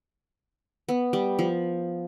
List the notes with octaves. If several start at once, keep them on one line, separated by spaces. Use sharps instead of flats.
B3
G3
F3